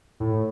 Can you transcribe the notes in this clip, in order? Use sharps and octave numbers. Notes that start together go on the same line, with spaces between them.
A2